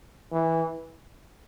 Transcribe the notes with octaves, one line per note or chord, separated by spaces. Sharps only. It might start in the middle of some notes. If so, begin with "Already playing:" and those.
E3